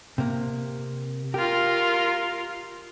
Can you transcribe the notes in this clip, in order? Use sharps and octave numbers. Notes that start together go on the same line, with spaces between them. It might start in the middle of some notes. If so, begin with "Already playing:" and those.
C3 A#3
F4 G4 A#4